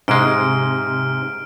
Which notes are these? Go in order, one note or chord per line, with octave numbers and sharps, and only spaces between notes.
G#2 C3 G#3 F6 D7